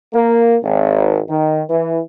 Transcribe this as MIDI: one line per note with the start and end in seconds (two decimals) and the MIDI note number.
0.13 0.56 58
0.63 1.19 32
1.29 1.62 51
1.69 1.99 52